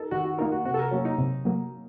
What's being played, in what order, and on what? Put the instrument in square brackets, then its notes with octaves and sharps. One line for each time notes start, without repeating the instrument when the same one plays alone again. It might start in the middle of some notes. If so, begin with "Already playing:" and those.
Already playing: [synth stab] D#4 A#4 [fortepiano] A4
[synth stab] D#3 [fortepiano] F#4
[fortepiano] F#4
[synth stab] A#3 D#4 A#4 [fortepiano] F4
[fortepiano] F#4
[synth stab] C3 [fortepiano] F#4
[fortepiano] A4
A#4
[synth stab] F#3 A#3 [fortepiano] C#4
[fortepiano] D#4
[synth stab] C3
F#3 A#3